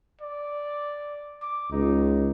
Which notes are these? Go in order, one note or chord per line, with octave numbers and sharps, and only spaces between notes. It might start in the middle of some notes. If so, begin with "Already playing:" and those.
D5
D6
C#2 D#4